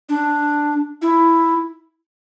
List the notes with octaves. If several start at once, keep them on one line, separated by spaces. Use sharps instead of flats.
D4
E4